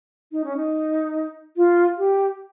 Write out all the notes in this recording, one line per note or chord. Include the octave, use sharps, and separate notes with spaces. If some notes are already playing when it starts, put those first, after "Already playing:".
D#4
C#4
D#4
F4
G4